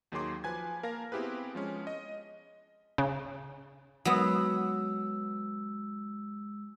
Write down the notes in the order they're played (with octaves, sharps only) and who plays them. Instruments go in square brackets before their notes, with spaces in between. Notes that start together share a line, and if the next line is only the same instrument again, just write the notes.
[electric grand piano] D#2 D#3 F#3 G#4 C6 D6
F3 B4 G#5 G#6
A#3 A#4 F5 A5 A#6
B3 C4 E4 G4 G#4 B4
F3 G#3 C#4
D#5
[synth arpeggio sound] C#3
[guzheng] F#3 B3 [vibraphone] G#3 E6